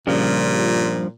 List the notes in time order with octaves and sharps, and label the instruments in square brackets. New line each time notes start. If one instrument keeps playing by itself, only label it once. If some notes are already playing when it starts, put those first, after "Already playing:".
[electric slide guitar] G2 F3 [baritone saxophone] A#2 [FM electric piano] C#3 G3